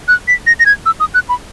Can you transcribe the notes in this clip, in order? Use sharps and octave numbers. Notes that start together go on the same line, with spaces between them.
F#6
B6
A#6
A#6
G#6
E6
D#6
F#6
B5